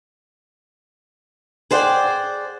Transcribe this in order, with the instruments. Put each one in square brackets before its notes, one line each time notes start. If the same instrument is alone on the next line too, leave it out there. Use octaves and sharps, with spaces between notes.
[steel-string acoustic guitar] G#4 C5 D5 F#5 G5